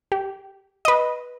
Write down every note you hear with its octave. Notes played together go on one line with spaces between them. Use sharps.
G4
B4 D#5